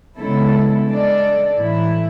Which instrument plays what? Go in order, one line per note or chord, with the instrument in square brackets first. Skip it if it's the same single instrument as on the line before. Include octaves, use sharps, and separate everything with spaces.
[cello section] C#3 G#3 B3 E4 A4
G#3 D4 A4 D5
A2 E3 A3 E4